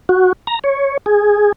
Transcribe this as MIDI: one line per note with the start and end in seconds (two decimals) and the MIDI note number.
0.09 0.33 66
0.47 0.59 82
0.64 0.97 73
1.06 1.52 68